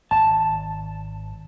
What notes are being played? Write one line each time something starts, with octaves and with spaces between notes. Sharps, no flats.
G#1 A5